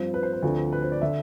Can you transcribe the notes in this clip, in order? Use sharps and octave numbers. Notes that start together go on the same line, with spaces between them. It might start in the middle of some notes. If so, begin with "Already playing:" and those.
Already playing: G2 F3 C4
B4
C5
B4
D2 D3 F3 C4
B4
C5
D5
D3 E5